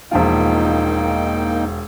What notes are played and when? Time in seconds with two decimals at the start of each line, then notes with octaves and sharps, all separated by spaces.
0.11 E1 F3 A#3 D#4 F4 G5